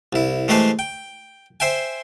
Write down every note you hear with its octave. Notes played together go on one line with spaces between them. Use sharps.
C2 E4
E3 G#3 A3 G4 B4 C5
G5
C5 E5 G5 G#5